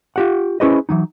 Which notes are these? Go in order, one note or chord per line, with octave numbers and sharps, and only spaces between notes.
F4 G4 F#5
C#4 E4 G#4 B4 C5 D#5
E3 F#3 D#4